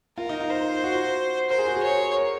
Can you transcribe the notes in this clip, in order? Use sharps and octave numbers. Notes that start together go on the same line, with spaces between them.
F4 A#4
D#4
F4
C5
F#4
A#4 C5
G#4
F#4
G#4
C#5
A#4